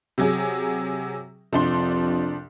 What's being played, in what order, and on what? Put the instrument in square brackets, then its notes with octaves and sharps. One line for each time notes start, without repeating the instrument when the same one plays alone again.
[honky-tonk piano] C3 F#3 G#4
[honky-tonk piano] C2 D4 C6 [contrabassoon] F2